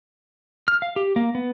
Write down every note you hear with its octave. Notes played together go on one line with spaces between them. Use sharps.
F6
F5
G4
A#3
B3